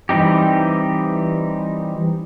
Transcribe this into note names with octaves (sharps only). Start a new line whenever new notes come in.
E3 G3 C4 D#4 G4